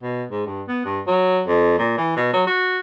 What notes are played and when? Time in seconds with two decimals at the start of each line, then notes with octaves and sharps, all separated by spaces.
0.03 B2
0.31 G#2
0.46 G2
0.68 B3
0.85 G2
1.07 F#3
1.47 F2
1.79 A#2
1.97 E3
2.17 B2
2.33 F#3
2.47 F#4